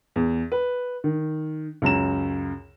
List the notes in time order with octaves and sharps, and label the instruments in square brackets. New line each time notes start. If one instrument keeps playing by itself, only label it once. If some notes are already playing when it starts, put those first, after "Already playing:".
[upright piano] E2
B4
D#3
C#2 F#2 A#5 E7